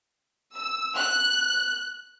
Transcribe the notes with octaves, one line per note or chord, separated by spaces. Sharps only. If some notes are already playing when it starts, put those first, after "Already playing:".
E6
F#6